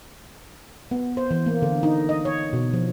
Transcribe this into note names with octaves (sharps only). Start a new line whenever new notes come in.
B3
C5
E3
A#3
D3
D#4
D#5
C#5
B2
F3